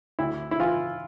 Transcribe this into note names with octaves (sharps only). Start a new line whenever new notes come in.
D2 E4
E4
E3 F4